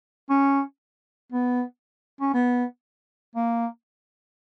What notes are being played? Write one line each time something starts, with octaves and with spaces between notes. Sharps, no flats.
C#4
B3
C#4
B3
A#3